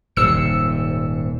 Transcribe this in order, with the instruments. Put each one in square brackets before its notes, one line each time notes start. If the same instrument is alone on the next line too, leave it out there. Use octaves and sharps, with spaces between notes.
[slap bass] D#1 G#2 C3 [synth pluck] E6 C#7